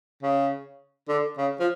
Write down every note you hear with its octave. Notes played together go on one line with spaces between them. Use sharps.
C#3
D3
C#3
F3